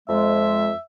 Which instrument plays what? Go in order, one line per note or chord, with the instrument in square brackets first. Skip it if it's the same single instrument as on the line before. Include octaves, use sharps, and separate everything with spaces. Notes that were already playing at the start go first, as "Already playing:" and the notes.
[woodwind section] F2 G#3 [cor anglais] E5